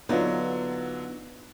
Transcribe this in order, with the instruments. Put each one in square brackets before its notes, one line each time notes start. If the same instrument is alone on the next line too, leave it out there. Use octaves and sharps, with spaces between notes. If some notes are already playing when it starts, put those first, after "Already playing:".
[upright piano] D3 F#3 D4 [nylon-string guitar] B3 D#4 F4